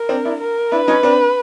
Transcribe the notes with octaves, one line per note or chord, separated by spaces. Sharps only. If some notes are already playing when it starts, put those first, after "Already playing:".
Already playing: A#4
C4 D4
D4 E4
A#4
D4 E4 B4
C#4 D#4
C4 D4